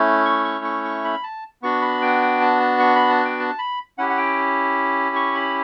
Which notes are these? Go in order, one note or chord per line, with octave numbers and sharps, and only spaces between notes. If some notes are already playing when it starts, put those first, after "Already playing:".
Already playing: A3 C#4 E4
C#6
C#6
C#6
C#6
B5
A5
B3 D4 F#4 C#6
B5
G5
G5
A5
A5
C#6
B5
A5
G5
A5
B5
C#4 E4 G4 F#5
F#5
G5
C#6
B5